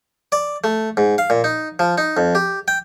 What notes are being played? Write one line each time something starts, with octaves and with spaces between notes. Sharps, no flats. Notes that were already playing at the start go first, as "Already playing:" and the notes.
D5
A3
G#2
F5
A#2
D#4
F3
D#4
F2
G4
G5